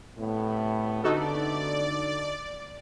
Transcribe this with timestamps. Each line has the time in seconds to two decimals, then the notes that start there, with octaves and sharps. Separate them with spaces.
0.18 A2 C3 A3 B3
1.04 D3 D#4 F#4 A4 D5